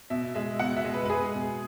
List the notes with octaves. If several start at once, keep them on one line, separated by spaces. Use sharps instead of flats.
B2 E5
G#3 E5
B2 F#5
E5
G#3
B4
B4
G#3 G#4
B2